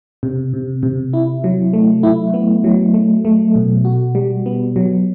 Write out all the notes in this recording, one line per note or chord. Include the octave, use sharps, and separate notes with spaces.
C3
C3
C3
E4
F#3
A3
E4
B3
F#3
A3
A3
B2
F#4
G3
B3
F#3